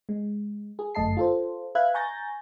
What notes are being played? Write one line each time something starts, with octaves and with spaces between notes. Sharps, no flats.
G#3
G#4
G1 F#2 A3 D#5 A5 C7
F4 A4 C5
B4 E5 F5 F#6 G#6
G#5 A#5 C#6 G6 A6 A#6